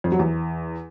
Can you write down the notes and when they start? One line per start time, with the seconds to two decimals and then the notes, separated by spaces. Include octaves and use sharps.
0.04 F2
0.12 F#3
0.19 E2